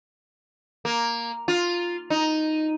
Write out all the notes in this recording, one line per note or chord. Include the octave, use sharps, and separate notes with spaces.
A#3
F4
D#4